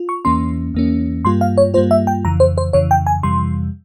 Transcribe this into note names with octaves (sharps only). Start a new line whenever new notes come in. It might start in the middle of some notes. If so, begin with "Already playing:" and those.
Already playing: F4
C#6
E2 E3 A#3 C#4 C6
E2 E3 A#3 C#4
G2 G3 A#3 F4 C6
F5
C#5
G2 G3 A#3 F4 C5
E5
G5
F2 C#3 E3 A#5
C5
C5
F2 C#3 E3 C#5
G5
G#5
F2 C3 E3 G3 C6